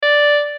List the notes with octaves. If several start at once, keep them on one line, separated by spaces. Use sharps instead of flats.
D5